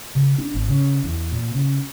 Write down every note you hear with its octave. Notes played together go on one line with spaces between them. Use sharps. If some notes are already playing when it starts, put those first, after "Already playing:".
C#3
D4
G#1
C#3
E2
A#2
C#3